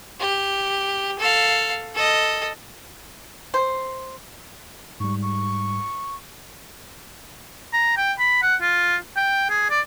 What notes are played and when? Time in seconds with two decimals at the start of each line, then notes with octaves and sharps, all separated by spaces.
0.20 G4
1.19 A4 F5
1.95 A4 D#5
3.54 C5
5.00 G#2 G3 C#6
5.22 C#6
7.74 A#5
7.97 G5
8.19 B5
8.43 F#5
8.62 F4
9.17 G5
9.50 G#4
9.70 D5